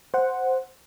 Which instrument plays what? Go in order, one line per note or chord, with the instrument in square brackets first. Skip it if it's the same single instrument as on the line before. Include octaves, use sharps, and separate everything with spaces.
[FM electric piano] C5 F#5